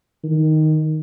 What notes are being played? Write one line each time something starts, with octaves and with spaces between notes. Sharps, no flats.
D#3